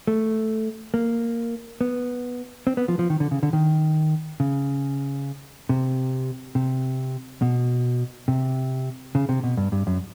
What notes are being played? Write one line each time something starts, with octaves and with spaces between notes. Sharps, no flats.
A3
A#3
B3
C4
B3
F3
F3
D#3
D3
C#3
D3
D#3
C#3
C3
C3
B2
C3
C#3
C3
B2
G2
G2
F#2